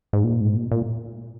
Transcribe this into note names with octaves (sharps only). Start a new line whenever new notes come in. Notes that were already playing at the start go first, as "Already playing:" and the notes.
G#2
A#2
G#2
A#2
A#2